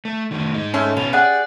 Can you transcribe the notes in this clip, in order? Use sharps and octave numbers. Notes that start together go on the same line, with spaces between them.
A3
D#3 A3
G#2 D#4
A3 C#4 A5 C6
B2 B3 A4 F5
G4 G#4 D5 F#5